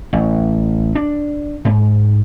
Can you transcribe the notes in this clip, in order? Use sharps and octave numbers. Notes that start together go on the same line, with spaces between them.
A1
D4
G#2